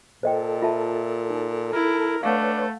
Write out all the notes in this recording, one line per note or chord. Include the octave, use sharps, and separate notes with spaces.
A#2 A4 C5 D#5 G5
F4 E5 A5
D#4
E4 A#4
A3 D4 B4 C#5 F5 F#5